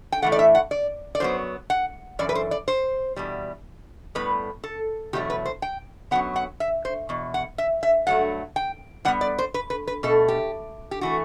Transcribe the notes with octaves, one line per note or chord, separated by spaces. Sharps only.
G5
A2 E3 A3 F#5
D5
E5
F#5
D5
D5
F#2 F#3 B3 C5
F#5
F#2 E3 D5
B4
C5
D5
C5
E2 B2 G3
A2 G3 B3 B4
A4
E2 B2 F#3 A3 G4
B4
C5
G5
F#2 F#3 B3 F#5
F#5
E5
C5
E2 B2
F#5
E5
E5
G2 F#3 A3 F#5
G5
A2 G3 B3 F#5
D5
C5
B4
B4
B4
B2 A3 A4
G4
G4
E3 A3 F#4